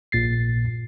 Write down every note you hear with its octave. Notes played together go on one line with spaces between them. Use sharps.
A#1 A#2 A6 C7